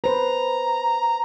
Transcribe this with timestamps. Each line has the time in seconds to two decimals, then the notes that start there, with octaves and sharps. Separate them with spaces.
0.04 B4 C5 A#5